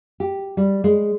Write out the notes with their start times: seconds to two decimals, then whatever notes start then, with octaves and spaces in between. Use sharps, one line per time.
0.20 G4
0.57 G3
0.84 G#3